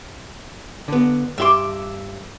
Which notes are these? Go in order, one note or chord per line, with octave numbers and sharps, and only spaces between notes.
D3 B3
G2 G4 E5 C6 D6